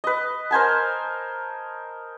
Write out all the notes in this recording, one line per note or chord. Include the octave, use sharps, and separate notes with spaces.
B4 D#5
A#4 C5 G#5 A5